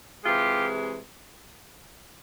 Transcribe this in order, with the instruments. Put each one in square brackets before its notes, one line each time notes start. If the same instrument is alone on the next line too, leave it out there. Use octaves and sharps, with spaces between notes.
[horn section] C3 E3 G#3 F4 G4